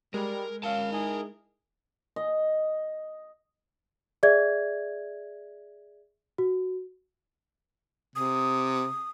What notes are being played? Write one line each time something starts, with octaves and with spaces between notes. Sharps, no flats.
G3 G#3 A#4
C#4 A#4 F5 A5
D#4 E4 G#4
D#5
G#4 D5 E5 G#6
F#4
C3 D#6